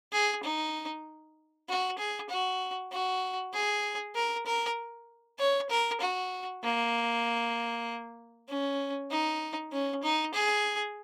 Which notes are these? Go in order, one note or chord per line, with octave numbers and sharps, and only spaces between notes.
G#4
D#4
F#4
G#4
F#4
F#4
G#4
A#4
A#4
C#5
A#4
F#4
A#3
C#4
D#4
C#4
D#4
G#4